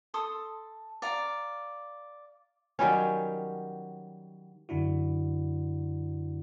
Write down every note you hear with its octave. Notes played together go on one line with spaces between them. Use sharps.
A4 C6 D#6
D5 F5 A#5
D#3 F#3 G3 C#4
F#2 D3 D4 E4 F#4